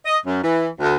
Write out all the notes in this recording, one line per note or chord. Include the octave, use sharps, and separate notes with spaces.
D#5
F#2
E3
D2